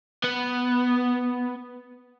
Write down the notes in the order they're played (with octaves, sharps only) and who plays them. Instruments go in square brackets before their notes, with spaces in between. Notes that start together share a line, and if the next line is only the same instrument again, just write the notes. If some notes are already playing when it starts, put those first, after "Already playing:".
[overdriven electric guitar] B3